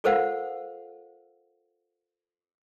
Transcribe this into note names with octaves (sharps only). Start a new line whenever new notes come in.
F4 A4 A#4 C5 F5 F#5